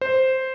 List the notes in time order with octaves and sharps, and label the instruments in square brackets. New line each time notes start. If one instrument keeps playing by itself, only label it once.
[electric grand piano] C5